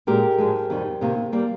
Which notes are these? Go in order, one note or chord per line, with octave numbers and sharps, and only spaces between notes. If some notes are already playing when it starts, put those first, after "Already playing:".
A#2 G#3 G4 A#4
G#2 F3 G#3
F2 D#3 G3
C3 D#3 A#3
G3 A#3